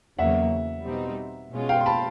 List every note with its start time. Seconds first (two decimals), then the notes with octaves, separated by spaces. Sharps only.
0.19 E2 C#3 F#3 A#3 E5 F#5
0.85 B2 G3 C4 D#4
1.52 B2 G#3 C#4 F4
1.69 F5 G5
1.81 C6
1.86 A5 B5